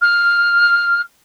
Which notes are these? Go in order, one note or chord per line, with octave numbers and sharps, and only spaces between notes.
F6